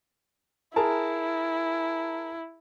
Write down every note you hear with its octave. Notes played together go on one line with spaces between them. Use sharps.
E4 G#4 A#4 A5